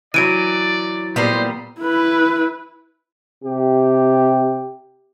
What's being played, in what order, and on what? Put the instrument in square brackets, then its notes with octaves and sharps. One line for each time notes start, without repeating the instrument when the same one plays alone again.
[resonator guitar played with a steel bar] E3 F#3 [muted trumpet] D5 [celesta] D7 D#7
[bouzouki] A#2 G3 B3 [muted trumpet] C5
[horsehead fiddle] E4 B4
[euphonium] C3 [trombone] G4